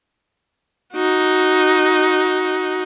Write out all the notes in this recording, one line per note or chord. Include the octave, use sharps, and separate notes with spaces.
D#4 F#4